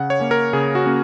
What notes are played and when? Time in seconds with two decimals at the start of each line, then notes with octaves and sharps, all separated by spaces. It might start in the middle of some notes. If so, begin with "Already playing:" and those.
Already playing: C#3 F#5
0.10 C#5
0.20 A#3 C#4
0.31 A#4
0.53 C#3 G#4
0.75 F#4
0.86 A#3 C#4